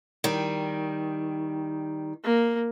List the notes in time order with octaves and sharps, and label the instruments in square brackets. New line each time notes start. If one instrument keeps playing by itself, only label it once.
[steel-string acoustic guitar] D#3 G3
[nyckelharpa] A#3